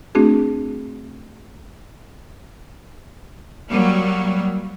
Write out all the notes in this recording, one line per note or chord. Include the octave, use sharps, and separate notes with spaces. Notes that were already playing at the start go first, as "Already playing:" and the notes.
A3 C4 D4 F#4 G#4
F#3 G3 A#3